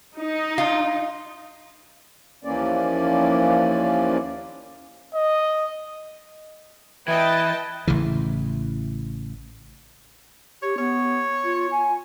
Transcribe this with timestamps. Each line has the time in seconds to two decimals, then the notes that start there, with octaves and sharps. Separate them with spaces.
0.18 D#4
0.58 F4
2.44 D#2 E3 F3 A#3 C#4 D5
5.15 D#5
7.08 E3 B4 D#5 E5 G5 A5
7.87 A1 C#3 E3
10.62 G4 C#5
10.78 B3 C#5
11.44 F4
11.71 G#5